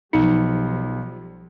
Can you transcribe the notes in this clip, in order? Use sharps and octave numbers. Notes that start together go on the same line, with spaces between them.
B1 F3 G3 D#4 C#7